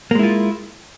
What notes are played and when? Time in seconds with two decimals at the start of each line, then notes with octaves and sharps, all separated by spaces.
0.11 A#3
0.15 G#3
0.19 E4
0.23 F4